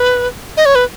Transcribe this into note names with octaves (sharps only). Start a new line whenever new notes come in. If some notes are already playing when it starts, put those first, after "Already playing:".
Already playing: B4
D#5
C#5
B4